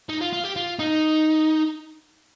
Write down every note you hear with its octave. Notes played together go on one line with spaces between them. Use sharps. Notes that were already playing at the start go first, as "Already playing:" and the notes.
D#4
F4
F4
G4
F4
D#4